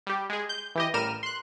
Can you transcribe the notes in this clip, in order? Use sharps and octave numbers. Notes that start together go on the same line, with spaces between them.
G3 G4
G#3 G#4
G6
E3 G4 D#5
A1 G3 A#4 F6 D#7 E7
C6 F#6